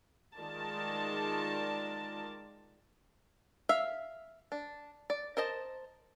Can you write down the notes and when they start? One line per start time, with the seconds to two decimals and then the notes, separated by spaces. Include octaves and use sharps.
0.36 D#3 G#3 F4 A#4 D5 A5
3.69 E5 F5
4.52 D4
5.10 D5
5.37 A#4 C5 D#5 A5